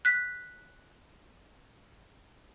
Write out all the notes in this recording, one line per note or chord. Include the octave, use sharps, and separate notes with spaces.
F#6 B6